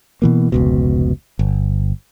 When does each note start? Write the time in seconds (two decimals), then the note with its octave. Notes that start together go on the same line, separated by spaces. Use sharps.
0.22 B2 E3 A#3
0.52 F1 C#2 B2
1.39 G1